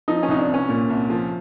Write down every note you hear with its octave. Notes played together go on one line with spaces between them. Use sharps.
F3 D#4
C#4
C2 D#4
D4
C2
C#4
A#2
C2
F3